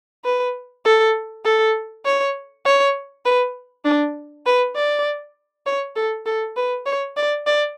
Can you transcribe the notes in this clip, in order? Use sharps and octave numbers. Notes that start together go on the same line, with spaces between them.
B4
A4
A4
C#5
C#5
B4
D4
B4
D5
C#5
A4
A4
B4
C#5
D5
D5